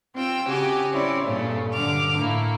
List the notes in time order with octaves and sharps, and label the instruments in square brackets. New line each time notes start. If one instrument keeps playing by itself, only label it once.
[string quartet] C4 F4 G5 E6
C#3 F#4 G4 G#5
C4 C#4 E4 C#5 D5
G2 A#2 C#3 A3 C#4
G2 D3 D6 F6
A2 A3 A#3 E4